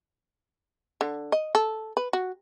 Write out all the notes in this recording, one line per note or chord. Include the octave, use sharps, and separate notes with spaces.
D3
D#5
A4
B4
F#4